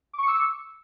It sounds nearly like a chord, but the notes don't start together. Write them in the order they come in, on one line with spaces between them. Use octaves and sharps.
D6 C#6 C#7 E6